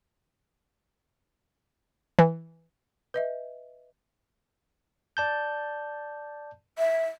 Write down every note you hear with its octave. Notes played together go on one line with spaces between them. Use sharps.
E3
B4 D#5 E5
D5 A5 G6
E5